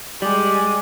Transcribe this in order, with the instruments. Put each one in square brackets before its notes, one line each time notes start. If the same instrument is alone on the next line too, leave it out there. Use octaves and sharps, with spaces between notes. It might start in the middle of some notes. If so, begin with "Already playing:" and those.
[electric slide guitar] G3 [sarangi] G#3 [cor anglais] D5